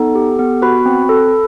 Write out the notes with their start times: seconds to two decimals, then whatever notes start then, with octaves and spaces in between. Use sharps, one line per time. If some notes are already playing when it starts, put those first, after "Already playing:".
Already playing: B3 D#4 A4
0.15 G4
0.39 B3
0.62 F#4 B4 B5
0.86 C4
1.09 A4